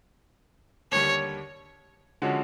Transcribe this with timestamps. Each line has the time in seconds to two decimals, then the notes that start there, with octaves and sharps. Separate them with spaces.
0.91 D#2 D3 G3 C#5
2.22 D3 F3 G#3 C#4 F#4